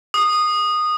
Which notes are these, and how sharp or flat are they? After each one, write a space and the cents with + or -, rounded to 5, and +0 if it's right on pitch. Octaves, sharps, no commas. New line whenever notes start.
D#6 -15